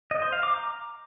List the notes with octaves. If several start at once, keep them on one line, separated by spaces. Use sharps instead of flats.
D#5
C5
F5
D6
A#5